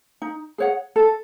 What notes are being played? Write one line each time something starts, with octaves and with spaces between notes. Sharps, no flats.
D#4
G#4 C#5 F#5
A4